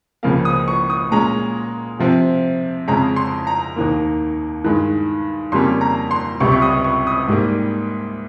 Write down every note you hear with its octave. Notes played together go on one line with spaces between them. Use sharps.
C#2 C#3 F3 A#3 F5
D#6
C#6
D#6
A#2 G#3 C#4 A#5
C3 F3 C4
F2 C#3 G#3 C#4 A#5
C6
A#5
D#2 D#3 A#3
G2 D#3 G#3
F2 C#3 G3 A#3 C#4 C6
A#5
C6
C#2 C3 G3 C#6
C#6
D#6
C#6
D#6
G#2 G3 A#3